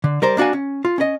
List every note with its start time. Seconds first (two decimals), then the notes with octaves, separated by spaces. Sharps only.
0.04 D3
0.22 G3 A#4 C5
0.37 A#3 D4 F#4 F5 G#5
0.53 C#4
0.85 F4
0.98 C#4 D#5